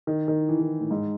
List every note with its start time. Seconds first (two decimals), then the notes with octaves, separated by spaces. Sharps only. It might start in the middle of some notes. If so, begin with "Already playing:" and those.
0.07 D#3
0.28 D#3
0.49 E3
0.59 D#3
0.80 A2
0.91 G#2